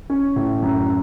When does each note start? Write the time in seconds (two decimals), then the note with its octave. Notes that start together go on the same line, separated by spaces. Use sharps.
0.10 C#4
0.36 A2
0.62 F#2